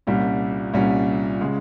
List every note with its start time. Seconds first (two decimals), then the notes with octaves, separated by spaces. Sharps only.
0.07 C2 A#2 G3 C#4
0.74 C2 A#2 G3 C#4
1.41 C#3 G#3